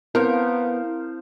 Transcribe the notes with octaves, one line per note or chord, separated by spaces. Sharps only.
B3 C4 E4 A#4 C5 F5